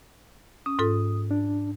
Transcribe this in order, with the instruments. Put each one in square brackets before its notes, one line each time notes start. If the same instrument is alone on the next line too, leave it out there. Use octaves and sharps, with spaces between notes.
[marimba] C#4 [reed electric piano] D#6
[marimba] G#2 F4 A4
[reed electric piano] D4